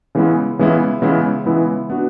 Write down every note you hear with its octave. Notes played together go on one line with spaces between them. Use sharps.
C#3 E3 G#3 B3 E4
C#3 E3 G#3 B3 E4
C#3 E3 G#3 B3 E4
C#3 E3 G#3 B3 E4
B3 D4 F#4